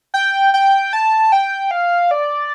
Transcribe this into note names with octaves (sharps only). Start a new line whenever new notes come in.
G5
G5
A5
G5
F5
D5